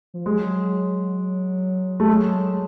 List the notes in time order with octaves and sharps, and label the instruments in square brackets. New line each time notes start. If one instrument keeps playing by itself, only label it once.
[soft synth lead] F3
[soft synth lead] F#3 [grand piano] G#3
[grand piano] A3
G#3